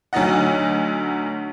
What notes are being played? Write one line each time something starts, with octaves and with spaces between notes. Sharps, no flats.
D2 F#3 D#4 D#5 F#5